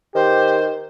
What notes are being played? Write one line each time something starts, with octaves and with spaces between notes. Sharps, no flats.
D#3 G4 C5